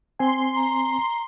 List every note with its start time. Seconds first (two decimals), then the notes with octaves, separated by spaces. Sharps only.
0.19 C4 G#5 C6
0.56 A#5